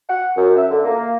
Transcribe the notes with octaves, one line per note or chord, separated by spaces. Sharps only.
F#5
F#2
E5
D3
A#3